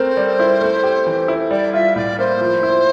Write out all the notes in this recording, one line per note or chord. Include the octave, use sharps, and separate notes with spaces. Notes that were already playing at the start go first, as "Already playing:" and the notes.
Already playing: A3 C4 A#4 C5
G3
E4
A3
G4
E3
E4
G3 D5
F4 E5
A2 D5
A#3 C5
F3
E4